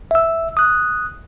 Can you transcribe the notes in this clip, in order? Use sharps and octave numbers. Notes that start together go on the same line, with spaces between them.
E5 E6
D#6 F#6